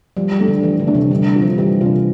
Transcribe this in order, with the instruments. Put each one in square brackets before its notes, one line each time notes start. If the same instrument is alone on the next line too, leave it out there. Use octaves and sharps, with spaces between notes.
[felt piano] F3 [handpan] G3
[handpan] G3
[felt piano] A3 D4 A4
[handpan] D3
[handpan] E3 [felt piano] F3
[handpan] D3
[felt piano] A3 D4 A4
[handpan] C3
[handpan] D3 [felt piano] G3
[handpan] E3
[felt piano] D4 F4
[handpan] F3
[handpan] E3 [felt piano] G3
[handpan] C3 [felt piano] F4
[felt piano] D4